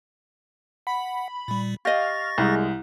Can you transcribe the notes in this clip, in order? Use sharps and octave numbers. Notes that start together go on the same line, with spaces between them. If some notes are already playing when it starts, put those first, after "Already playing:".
F#5 B5
A#2 G3
G4 D#5 F5 C#6 A6 A#6
C2 G#3